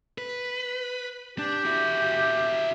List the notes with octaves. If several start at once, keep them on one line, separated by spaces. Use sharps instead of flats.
B4
D4 G4
E4 F#4